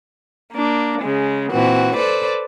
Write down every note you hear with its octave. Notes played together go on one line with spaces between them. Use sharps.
A#3 D4
C#3 G#3
A#2 E3 C4 F#4
A4 B4 C5 D5